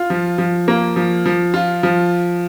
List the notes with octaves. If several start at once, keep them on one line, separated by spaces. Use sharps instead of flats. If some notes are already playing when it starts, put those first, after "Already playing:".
Already playing: F4
F3
F3
A#3
F3
F3
F4
F3